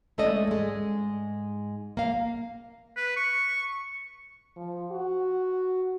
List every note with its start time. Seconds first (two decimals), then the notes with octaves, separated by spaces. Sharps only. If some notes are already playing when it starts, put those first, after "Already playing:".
0.18 G#3 A3 C#4 A4 D5 D#5
0.47 G#2 G#3
1.97 A#3 F5
2.97 B4
3.16 C#6
4.57 F3
4.92 F#4